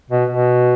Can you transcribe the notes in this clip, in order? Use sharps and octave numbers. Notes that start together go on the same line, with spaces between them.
B2
B2